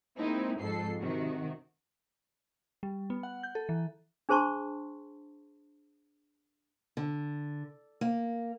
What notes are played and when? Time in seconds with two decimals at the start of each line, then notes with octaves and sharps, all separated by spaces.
0.16 G#3 A#3 C4 D#4 E4
0.59 F2 G#2 F3 A4 C7
1.00 C3 D#3 F#4
2.83 G3
3.10 B3
3.23 F#5
3.43 G6
3.55 A4
3.69 E3
4.29 D4 G#4 C5 A5 C6 C#6
6.97 D3
8.01 A#3